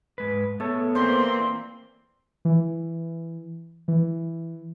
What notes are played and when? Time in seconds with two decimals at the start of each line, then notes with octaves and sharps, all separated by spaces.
0.18 G#2 G#3 B4
0.60 A3 B3 A4 C#5
0.95 A#2 E3 A#3 C4 C5 D5 C6
2.45 E3
3.88 E3